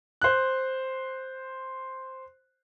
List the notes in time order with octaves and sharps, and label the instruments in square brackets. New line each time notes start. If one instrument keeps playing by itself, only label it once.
[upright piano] C5 F#6